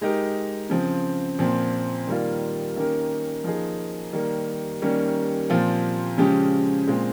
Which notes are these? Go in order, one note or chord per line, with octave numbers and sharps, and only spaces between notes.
G#3 D#4 G4 A#4
C#3 F3 C4
A#2 F3 C4
D#3 G3 A#3 F4
D#3 A#3 C#4 G4 A#4
F3 A#3 D#4 G#4
D#3 G3 A#3
D#3 G3 A#3 C#4
A#2 F3 C4 F4
C#3 F3 G#3 C#4 G4
A#2 G#3 C4 F4